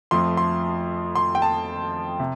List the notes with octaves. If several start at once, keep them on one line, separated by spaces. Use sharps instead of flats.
F2 F3 A3 C6
C6
C6
G5
A5
C3